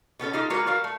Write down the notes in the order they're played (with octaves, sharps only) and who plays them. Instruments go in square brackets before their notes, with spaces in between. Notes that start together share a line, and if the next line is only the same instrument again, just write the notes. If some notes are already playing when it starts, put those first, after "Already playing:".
[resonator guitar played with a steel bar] B2 B3 C#4 A4
D#4 F4 G4 A4
G#3 A#3 F4 F#4 A#4 B4
G3 F#4 A#4 F5
A3